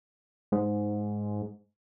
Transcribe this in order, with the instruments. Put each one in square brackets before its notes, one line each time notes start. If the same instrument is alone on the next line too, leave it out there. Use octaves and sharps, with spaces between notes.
[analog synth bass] G#2